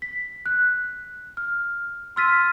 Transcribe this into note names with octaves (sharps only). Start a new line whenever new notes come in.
B6
F#6
F6
C6 E6 F6 A6 B6 D#7